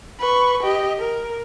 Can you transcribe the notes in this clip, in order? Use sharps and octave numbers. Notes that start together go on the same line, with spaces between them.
B4 C#6
G4 D#5
A#4